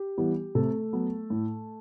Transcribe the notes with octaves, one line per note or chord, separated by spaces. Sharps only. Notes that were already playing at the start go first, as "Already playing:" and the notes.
Already playing: G4
E3 G3 B3
C3 A3 A4
F#3 B3
A2